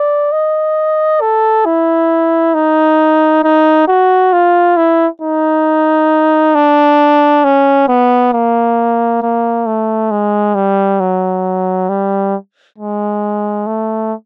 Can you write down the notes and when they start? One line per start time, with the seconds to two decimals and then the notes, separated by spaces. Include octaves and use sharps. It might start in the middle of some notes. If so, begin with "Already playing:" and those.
Already playing: D5
0.32 D#5
1.21 A4
1.66 E4
2.54 D#4
3.44 D#4
3.88 F#4
4.33 F4
4.77 E4
5.21 D#4
6.55 D4
7.44 C#4
7.88 B3
8.33 A#3
9.22 A#3
9.66 A3
10.11 G#3
10.55 G3
11.00 F#3
11.89 G3
12.78 G#3
13.67 A3